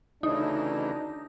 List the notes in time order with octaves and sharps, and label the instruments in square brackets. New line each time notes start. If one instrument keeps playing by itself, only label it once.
[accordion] D2 C#3 E3 [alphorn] D4 [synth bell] D#4